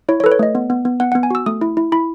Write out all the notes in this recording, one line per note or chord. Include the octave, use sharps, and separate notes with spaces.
E4 C#5
C#5
A4 B4
C#5
A3 D#5
B3
B3
B3
B3 F#5
B3 F#5
G#5
F#4 E6
A3 D#6
E4
E4
E4 B5